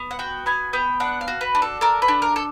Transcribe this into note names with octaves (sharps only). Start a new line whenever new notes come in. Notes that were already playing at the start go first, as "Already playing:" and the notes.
Already playing: B3
F#5
F#4 G5
B3 G#5
B3 G5
D4 F#5
F5
F#4
B4
D4
A4
A4 A#4
B4
D4
A#4
A4